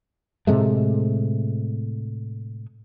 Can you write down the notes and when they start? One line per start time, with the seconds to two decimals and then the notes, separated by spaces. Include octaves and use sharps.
0.47 A2 C3 G#3 A3